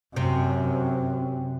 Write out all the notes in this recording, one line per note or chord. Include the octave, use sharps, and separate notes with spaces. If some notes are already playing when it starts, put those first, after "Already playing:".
F#2 C3